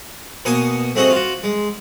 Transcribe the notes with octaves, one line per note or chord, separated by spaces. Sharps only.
B2 A#3 G#5 C#6 D#6
A3 C4 F#4 G#4 D#5
F4 F#4
G#3